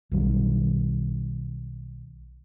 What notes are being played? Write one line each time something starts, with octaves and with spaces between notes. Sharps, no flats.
B1 B2 D#3 G3